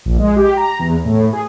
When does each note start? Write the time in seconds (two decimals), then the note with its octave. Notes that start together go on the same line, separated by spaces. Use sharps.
0.06 A#1
0.19 G#3
0.36 G4
0.57 A#5
0.79 E2
1.05 A2
1.33 G#4